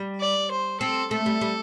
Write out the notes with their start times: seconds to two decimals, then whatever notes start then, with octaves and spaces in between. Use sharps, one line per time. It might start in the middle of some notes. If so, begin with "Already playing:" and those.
Already playing: G3
0.20 D5
0.51 C5
0.80 C4 A4
1.11 A3 A4
1.26 G3
1.41 G3